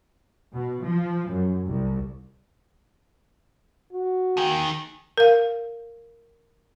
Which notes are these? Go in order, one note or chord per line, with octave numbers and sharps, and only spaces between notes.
B2
F3
F#2
C2
F#4
D#2 D#3 G#4 G5
A#4 F5